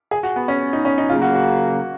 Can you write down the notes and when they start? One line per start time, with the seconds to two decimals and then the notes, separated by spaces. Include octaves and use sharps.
0.11 G#4
0.23 F#4
0.36 B3
0.48 C#4
0.73 D#4
0.85 C#4
0.98 D#4
1.09 C#3 F#3 A#3 F4
1.22 F#4
1.35 F#4